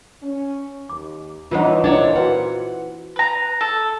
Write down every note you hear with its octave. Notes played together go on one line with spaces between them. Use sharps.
C#4
D#2 D6
E3 F3 B3 C#4 D#4 F4 C5 F#5
A#2 D4 E4 C5 C#5 D#5 F#5
F#4 B4 F#5
B4 A#5
A4